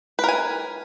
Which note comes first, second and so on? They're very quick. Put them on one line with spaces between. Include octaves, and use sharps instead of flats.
B4 A#4 G#5